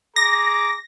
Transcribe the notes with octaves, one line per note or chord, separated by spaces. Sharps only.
G#4 A#5 D6 A#6